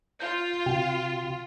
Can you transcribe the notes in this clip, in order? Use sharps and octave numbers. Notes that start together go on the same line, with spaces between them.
F4 G6
C3 F#4 G5